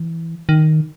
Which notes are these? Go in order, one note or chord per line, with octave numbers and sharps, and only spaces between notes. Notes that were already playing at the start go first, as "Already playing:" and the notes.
Already playing: E3
D#3